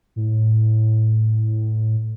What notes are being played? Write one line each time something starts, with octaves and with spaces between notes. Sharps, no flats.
A2